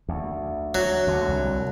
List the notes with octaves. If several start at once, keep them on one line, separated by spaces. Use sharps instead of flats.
D2
F#3
D2 D3
C2